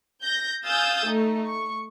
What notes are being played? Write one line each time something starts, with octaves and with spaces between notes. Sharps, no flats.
G6 A#6
F5 G#5 D#6 E6 G6 A6
A3 D#4
C#6